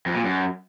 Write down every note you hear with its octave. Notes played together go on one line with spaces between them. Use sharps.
F2
A#2
F#2